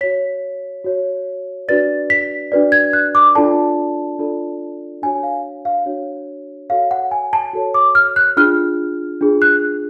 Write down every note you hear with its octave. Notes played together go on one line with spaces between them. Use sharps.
F#4 C#5 B6
F#4 C#5
D4 F#4 B4 D5 A6
B6
D4 F#4 B4 D5
G#6
F#6
D6
D4 F4 A4 D5 A5
D4 F4 A4 D5
D4 F#4 C#5 G#5
F5
F5
D4 F#4 C#5
F#4 A4 C#5 F5
F#5
G#5
A5
F#4 A4 C#5
D6
F6
F#6
D4 F4 G#4 F6
D4 F4 G#4
F#6